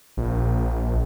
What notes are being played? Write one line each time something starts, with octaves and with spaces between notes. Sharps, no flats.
A#1